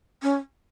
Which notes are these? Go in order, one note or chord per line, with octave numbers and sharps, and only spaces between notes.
C#4